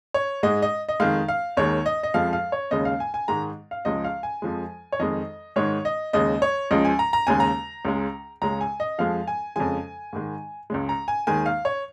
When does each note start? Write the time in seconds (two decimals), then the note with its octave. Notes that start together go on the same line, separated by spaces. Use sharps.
0.14 C#5
0.43 G#2 G#3 D#5
0.62 D#5
0.89 D#5
1.00 F2 D#3 G#3 F5
1.29 F5
1.57 D#2 D#3 G#3 C#5
1.86 D#5
2.03 D#5
2.14 F2 F3 G#3 F5
2.33 F5
2.52 C#5
2.71 D#2 C#3 G#3 D#5
2.85 F5
3.00 G#5
3.14 G#5
3.28 G#2 D#3 G#3 A#5
3.71 F5
3.85 C#2 C#3 F3 G#3 D#5
4.04 F5
4.23 G#5
4.42 F2 F3 G#3
4.92 C#5
5.00 F2 D#3 G#3 D#5
5.56 G#2 D#3 G#3 C#5
5.85 D#5
6.13 D#2 C#3 G#3 D#5
6.42 C#5
6.71 C#2 C#3 F3 G#3 D#5
6.85 G#5
6.99 A#5
7.13 A#5
7.27 D#2 C#3 G#3 G#5
7.40 A#5
7.85 C#2 C#3 G#3
8.42 C#2 C#3 G#3 A#5
8.61 G#5
8.80 D#5
8.99 F2 F3 G#3 F5
9.27 G#5
9.56 F2 C#3 F3 G#3 G#5
10.13 G#2 D#3 G#3
10.70 C#2 C#3 G#3
10.89 A#5
11.08 G#5
11.27 D#2 D#3 G#3 G#5
11.46 F5
11.65 C#5